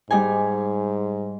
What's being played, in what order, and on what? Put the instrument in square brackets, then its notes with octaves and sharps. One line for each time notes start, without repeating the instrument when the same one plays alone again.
[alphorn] G#2 [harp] G3 D#4 G#5